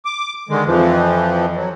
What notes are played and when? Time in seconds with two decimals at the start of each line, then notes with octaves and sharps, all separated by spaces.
0.05 D6
0.49 D3 D#3 G#3
0.66 F2 E3 F3
1.56 F#3